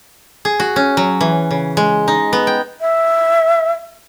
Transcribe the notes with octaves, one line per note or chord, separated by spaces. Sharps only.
G#4
F#4
C#4
F#3
E3
C#3
G#3
D#4
B3
G5
E5